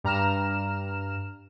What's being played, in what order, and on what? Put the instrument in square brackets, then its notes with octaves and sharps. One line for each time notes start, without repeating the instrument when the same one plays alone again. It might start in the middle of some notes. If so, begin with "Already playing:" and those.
[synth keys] G2 A#5 F6 E7